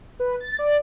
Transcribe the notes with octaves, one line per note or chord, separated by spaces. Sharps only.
B4
A6
D5